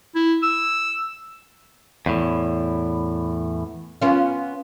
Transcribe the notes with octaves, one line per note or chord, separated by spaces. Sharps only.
E4
E6
E2 A2
B3 C#4 F4